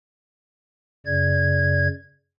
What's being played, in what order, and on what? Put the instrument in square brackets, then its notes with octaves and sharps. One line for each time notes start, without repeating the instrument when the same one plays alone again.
[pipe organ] F#2 C#3 D5 G#6